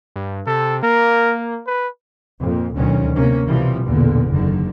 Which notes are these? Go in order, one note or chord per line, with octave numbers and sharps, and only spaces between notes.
G2
C3 A4
A#3 A#4
B4
F2 A#2
D2 B2 D#3 F#3 C#4
C3 A#3 C#4
C2 B2 E3 F3 G3
B1 E2 A#2 D3
F#1 D3 D#3